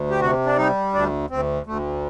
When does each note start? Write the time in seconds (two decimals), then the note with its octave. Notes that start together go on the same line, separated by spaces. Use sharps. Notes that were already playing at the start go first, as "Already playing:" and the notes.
Already playing: D2
0.10 G4
0.21 C3 F#4
0.46 D4
0.57 G3 D#4
0.93 D2 D4
1.30 D2 C4
1.66 D2 A3